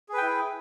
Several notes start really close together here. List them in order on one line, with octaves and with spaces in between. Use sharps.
G#4 B4 G5 E4